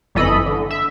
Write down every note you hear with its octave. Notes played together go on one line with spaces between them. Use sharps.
G1 F2 E3 A4 D#5 B5
D3
E5